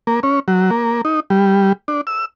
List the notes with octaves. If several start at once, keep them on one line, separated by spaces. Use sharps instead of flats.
A#3
C#4
F#3
A#3
D#4
G3
D4
E6